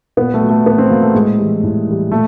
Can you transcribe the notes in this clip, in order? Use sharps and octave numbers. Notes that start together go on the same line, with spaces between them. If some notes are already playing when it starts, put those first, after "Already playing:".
A#2 B3
A3
F#3
A3
A#2 B3
C4
F#3 A#3
A3
A2 G#3
E3 G3
A2
E3 G3
A#2 A3